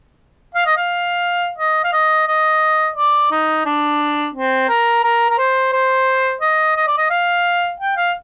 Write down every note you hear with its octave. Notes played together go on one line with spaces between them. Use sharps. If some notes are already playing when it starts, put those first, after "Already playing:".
F5
D#5
F5
D#5
F5
D#5
D#5
D5
D#4
D4
C4
A#4
A#4
A#4
C5
C5
D#5
D#5
D5
D#5
F5
G5
F5